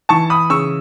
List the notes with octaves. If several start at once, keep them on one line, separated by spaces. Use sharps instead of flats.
E3 A5 C#6
B5 D#6
C#3 C#6 E6